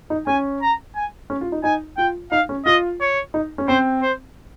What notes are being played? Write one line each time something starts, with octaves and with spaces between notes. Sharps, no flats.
D#4
C#4 G#5
A#5
G#5
C#4
F4
D#4
D#4 G#5
F4 G5
D#4 F5
C#4
F4 D#5
C#5
D#4
C#4
C4 C5
C5